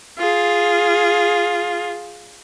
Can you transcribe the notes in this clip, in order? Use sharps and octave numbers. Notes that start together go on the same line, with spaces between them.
F4 G#4